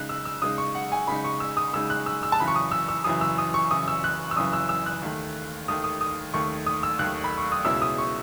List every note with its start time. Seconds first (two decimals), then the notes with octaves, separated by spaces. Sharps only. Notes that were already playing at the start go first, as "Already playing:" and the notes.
Already playing: C#3 G#3 D#4 F#6
0.09 E6
0.25 E6
0.42 C#3 G#3 D#4 D#6
0.58 C#6
0.75 F#5
0.92 G#5
1.07 C#3 G#3 D#4 B5
1.24 C#6
1.40 E6
1.57 D#6
1.73 C#3 G#3 D#4 E6
1.90 F#6
2.06 E6
2.23 E6
2.32 A5
2.39 F#2 C#3 E3 B5
2.48 C#6
2.56 D#6
2.71 E6
2.89 E6
3.04 F#2 C#3 E3 D#6
3.21 E6
3.38 D#6
3.54 C#6
3.71 F#2 C#3 E3 D#6
3.88 E6
4.04 F#6
4.31 E6
4.36 F#2 C#3 E3 D#6
4.53 E6
4.69 E6
4.86 F#6
5.02 D#2 D#3 A3
5.68 D#2 D#3 A3 D#6
5.84 D#6
6.01 D#6
6.34 D#2 D#3 A3 C#6
6.66 D#6
6.83 E6
6.99 D#2 D#3 A3 F#6
7.24 B5
7.38 C#6
7.52 D#6
7.65 C#2 B2 G#3 C#4 E4 E6
7.82 D#6
7.98 C#6